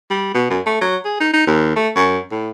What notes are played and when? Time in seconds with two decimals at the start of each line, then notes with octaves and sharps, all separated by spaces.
0.10 G3
0.34 B2
0.50 F#2
0.66 A3
0.81 F#3
1.05 G#4
1.20 D#4
1.33 D#4
1.47 D#2
1.76 A3
1.95 F#2
2.31 A2